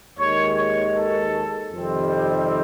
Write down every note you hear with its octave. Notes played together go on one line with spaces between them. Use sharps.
D#2 D#3 G#3 C#5
C#5
A4
F2 C3 D#3 G3 C4
G4